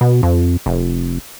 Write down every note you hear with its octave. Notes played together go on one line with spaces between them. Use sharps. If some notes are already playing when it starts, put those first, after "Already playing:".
B2
F2
F1